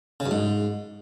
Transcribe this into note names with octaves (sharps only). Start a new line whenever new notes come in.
C#3
F#2
G#2